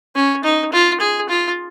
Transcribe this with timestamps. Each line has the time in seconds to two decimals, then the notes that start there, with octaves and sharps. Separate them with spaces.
0.15 C#4
0.44 D#4
0.72 F4
1.00 G#4
1.29 F4